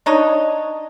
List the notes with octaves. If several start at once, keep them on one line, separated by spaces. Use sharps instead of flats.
D4 D#4 C#5 D#5